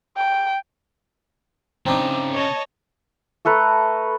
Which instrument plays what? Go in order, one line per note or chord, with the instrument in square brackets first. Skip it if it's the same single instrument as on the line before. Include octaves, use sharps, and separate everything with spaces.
[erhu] G5
[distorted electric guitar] C#3 A#5 [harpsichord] C4 D4 D#4
[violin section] C#5 D#5 A5
[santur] A3 A4 B4 A#5